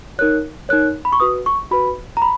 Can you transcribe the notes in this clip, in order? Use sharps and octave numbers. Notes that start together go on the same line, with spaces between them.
D#4 A#4 C#5 F#6
D#4 A#4 C#5 F#6
B5
C#6
F#4 B4 D#6
C#6
F#4 B4 B5
A#5
B5